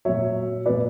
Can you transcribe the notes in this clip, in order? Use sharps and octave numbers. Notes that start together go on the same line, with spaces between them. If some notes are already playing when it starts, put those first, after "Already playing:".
A#2 F#3 C#5 E5
A#2 F#3 B4 D5